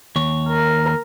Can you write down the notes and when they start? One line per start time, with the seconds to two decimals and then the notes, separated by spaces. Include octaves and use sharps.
0.16 D#2 C#5
0.49 A#4